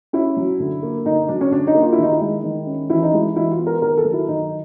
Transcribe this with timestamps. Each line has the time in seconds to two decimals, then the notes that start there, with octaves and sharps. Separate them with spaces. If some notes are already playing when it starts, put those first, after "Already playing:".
0.13 C#4 E4
0.37 F#3
0.60 D3
0.83 A#3
1.05 D3 D#4
1.28 F#3 D4
1.41 C#4
1.51 D3 D4
1.67 D#4
1.75 A#3
1.82 F4
1.92 E4
1.98 D#3 D#4
2.12 E4
2.21 G#3
2.44 D#3
2.67 C#4
2.90 E3 E4
3.03 D#4
3.13 G#3 E4
3.36 E3 E4
3.52 F4
3.59 B3
3.67 A#4
3.82 D#3 A#4
3.97 A4
4.05 F#3
4.13 E4
4.28 D#3 D#4